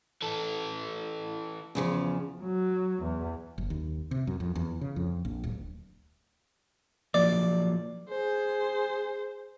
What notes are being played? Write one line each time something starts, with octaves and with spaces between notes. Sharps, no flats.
E3 A4
E2 C#3 F3
F#3
E2
F#1
D#2
C3
F#2
F2
E2
C#3
F2
A#1
D1
F3 F#3 A#3 D5
G#4 C5